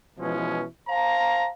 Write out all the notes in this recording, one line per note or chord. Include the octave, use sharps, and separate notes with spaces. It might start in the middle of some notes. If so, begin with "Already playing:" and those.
B2 E3 F3 G#3 C#4
C5 F5 A5 A#5